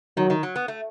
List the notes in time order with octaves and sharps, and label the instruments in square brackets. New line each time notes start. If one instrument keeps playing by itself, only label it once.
[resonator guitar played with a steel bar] D#3 [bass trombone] F#3
[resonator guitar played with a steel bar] D#3
F#3
B3
A3